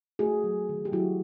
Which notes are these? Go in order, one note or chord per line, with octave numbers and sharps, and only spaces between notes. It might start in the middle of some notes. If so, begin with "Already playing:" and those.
A3 F#4 G#4
F#3
D#3
G4
F#3 E4 F#4